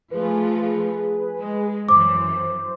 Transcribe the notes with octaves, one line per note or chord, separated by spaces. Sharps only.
F3 A3 F4 G#4 B4
G#3
F#2 E3 C5 D6